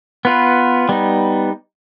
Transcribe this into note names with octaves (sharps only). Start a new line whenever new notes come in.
B3 F4 B4
G3 B3 D#4